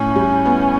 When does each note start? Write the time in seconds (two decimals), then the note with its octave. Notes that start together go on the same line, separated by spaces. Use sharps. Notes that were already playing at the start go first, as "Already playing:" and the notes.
Already playing: A2 C#4
0.16 G3
0.45 B3